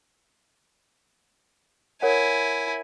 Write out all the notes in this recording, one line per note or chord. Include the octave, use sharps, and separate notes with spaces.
E4 A#4 C#5 F#5 G#5